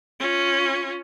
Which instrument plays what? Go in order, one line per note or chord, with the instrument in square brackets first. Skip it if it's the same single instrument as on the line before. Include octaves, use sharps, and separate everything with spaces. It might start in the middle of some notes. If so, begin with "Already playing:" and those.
[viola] C#4 F4